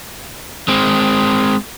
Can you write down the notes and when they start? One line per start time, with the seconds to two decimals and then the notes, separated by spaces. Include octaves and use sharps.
0.68 G#3 C4